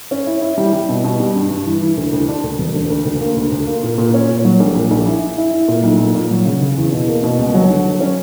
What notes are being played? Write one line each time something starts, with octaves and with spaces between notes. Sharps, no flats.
C#4
E4
E4
G3
G3
B2
B2
G3
G2
G2
E3
E3
D2
D2
D4
D2
E1
D2
D2
D2
A#3
D2
D2
A#3
A#2
A#2
C#4
A#2
F#3
A#1
A#2
A#1
E4
E4
E4
E4
A#2
B1
A#2
A#2
F#3
C#3
C#3
E2
B2
A#3
B2
C#2
F#3
D3
F#3
C#4